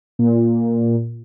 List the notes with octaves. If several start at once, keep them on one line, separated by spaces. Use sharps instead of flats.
A#2